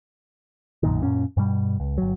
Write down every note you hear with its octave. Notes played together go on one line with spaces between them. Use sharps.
B1 F#2 A#2 D#3
F#2 A#2 C#4
G2 B2 G3
C#2
G1 F#3